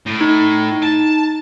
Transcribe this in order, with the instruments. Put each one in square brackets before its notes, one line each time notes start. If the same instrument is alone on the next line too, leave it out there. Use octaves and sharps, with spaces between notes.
[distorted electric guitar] A2
[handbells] D#4
[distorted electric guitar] A5